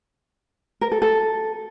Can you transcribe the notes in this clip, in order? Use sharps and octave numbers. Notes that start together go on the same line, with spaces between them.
A#4
A4
A4